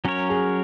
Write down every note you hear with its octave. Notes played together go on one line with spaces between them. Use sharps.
F#3 C#4 A#4 C#5
G#4